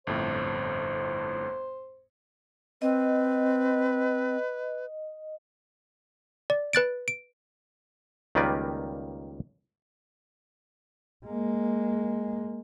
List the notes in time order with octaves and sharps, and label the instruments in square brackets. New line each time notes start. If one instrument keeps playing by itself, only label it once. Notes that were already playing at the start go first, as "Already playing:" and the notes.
[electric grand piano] G1 F2 A2 [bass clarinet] C5
[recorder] C4 [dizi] B4 [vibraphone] D#5
[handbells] D5
B4 F#6 A6 D7
D7
[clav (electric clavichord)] C#2 D#3 G3 A#3 B4 D5
[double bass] G#3 A#3